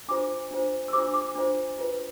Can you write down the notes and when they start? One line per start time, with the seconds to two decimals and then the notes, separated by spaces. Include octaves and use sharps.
0.08 D4 F4 C5 D6
0.51 D4 F4 C5
0.88 E6
0.93 D4 F4 C5 D6
1.14 D6
1.35 D4 F4 C5
1.78 F4 B4